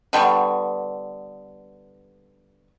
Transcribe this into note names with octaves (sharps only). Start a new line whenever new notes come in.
D3 G3 B3 C#6